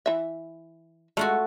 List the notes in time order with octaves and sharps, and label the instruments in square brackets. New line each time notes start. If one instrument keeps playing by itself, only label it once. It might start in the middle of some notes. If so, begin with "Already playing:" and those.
[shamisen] E3 E5
[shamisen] G#3 [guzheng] A3 F4 F#4